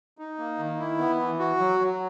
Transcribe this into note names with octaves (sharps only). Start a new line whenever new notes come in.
D#4
A#3
D#3
E4
B3
E3
F#4
F#3
F#3